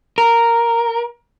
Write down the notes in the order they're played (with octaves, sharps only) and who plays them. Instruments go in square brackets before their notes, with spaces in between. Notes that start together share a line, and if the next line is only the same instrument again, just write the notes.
[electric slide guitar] A#4